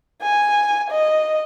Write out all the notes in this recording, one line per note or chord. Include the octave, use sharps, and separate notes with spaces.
G#5
D#5